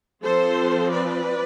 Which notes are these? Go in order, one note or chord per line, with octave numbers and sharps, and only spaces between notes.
F3 C4 A4 C5
B4 D5